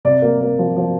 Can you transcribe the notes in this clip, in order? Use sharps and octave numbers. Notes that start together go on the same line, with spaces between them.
C3 D5
A#3
A#3
F3
F3